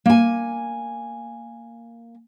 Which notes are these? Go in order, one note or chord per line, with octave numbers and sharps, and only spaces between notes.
A#3 G#5